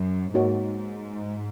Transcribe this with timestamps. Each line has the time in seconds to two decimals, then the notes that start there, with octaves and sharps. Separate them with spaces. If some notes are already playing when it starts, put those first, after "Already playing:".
Already playing: F#2
0.33 G#2 A#3 D#4 F#4 C#5